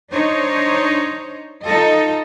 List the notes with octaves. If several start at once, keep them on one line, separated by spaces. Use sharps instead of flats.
D4 D#4 C5 C#5 D#5
D#4 F4 A4 D#5